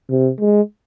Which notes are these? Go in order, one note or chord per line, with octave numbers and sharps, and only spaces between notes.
C3
G#3